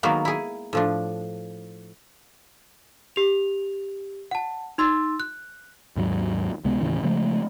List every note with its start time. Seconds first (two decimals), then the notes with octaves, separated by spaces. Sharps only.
0.03 D#3 F#3 G#3 A#3 B3
0.25 E4 G#4
0.73 A2 F3 D4
3.16 G4 F7
4.31 F#5 A5
4.78 D#4 C6 E6 A6
5.20 F#6
5.96 D#2 G#2 F#3
6.64 C#2 C3 G#3 B3
6.81 D#2 A2 C#3 E3
7.04 C#3 F3 G#3 A3